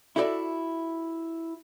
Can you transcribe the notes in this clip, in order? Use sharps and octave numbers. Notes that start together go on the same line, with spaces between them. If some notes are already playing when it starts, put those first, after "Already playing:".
E4 F#4 A4 C5 D5 E5